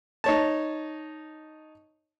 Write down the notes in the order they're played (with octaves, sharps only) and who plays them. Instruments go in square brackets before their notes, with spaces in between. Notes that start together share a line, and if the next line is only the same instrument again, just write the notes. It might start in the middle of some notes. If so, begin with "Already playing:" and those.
[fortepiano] D#4 C#5 A5